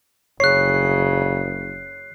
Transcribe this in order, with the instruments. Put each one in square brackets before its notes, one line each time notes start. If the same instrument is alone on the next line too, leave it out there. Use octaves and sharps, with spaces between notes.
[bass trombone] F#1 [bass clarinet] C#3 [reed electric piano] C#5 [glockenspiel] F#6 C7